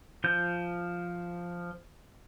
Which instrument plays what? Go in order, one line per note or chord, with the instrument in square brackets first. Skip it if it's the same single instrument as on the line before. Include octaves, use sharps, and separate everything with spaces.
[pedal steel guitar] F3 G6